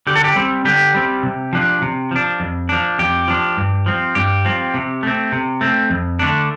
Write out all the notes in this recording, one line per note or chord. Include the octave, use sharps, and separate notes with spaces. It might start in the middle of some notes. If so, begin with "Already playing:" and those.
D3 G4
A4
G4
G3 C4
D3 G4
G3 C4
C3
F3 D4
C3
F3 D4
F2
F3 D4
F2 G4
F3 D4
G2
F3 C4
G2 G4
F3 C4
C3
A3 C4
C3
A3 C4
F2
D3 A3 D4